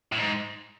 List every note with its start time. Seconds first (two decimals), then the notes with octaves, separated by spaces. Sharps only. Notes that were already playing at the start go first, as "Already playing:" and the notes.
0.12 A2
0.18 G#2